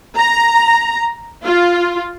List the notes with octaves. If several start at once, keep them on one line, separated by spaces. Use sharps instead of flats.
A#5
F4